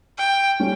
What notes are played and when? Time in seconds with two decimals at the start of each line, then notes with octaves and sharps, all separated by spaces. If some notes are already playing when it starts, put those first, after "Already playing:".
0.18 G5
0.60 G3 C#4